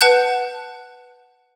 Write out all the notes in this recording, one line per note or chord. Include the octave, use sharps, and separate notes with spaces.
B4 F#5 A5 F#6 G6